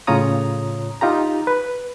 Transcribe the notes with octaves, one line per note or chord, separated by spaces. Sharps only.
A2 C#3 F4 C#5 A#5 D#6
D#4 F4 G4 A#5
B4